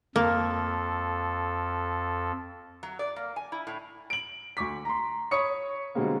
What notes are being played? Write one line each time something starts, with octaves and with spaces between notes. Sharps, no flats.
F2 A#3 A4
F#3
D5
A#3
G#5
E4
A2
D7 F#7
D2 C#6 D6 B6
A#5 C6
C#5 B5 C#6 D#6 C#7
B2 D3 G3 G#3 A#3 C4